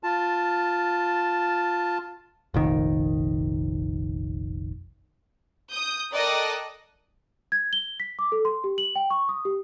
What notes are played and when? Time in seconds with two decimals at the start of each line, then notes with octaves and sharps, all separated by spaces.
0.03 F4 A5
2.54 F1 A#1 D#3
5.72 D#6 G6
6.15 A4 A#4 D5 D#5 G5 F#6
7.52 G#6
7.73 G7
8.00 B6
8.19 D6
8.32 A4
8.45 C6
8.64 G4
8.78 F#7
8.96 G5
9.10 C#6
9.29 D#6
9.45 G4